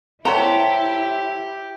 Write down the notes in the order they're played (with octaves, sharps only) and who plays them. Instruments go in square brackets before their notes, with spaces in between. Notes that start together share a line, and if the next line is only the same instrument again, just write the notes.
[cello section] E4 [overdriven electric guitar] G4 [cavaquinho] A4 C5 [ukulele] C#5 F#5 A#5